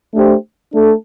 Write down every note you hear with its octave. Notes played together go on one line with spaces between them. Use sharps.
A3 D4 G4 C5
A3 D4 A4